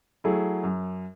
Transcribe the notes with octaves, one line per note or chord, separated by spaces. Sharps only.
F#3 A3 E4 G#4
F#2